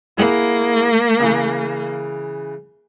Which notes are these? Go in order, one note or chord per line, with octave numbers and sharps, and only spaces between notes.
A#3 E4 G#4 F#5
C#3 E3